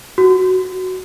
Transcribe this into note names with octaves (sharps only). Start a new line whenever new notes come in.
F#4